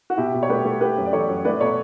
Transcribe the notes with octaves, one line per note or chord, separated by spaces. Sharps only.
F#4
B2 E4 G4
B2
C#5
A3 G4 B4
A3
A3 G4 B4
F#2
D5
E3 A4 C#5
F#2
A3 B4 D5
B2 A4 C#5